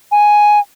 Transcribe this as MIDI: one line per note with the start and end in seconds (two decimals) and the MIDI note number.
0.12 0.59 80